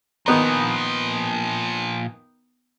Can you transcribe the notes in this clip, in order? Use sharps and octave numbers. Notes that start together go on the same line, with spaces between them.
A#2 D#3 F3 B3 A#5